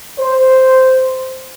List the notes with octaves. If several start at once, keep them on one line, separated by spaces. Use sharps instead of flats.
C5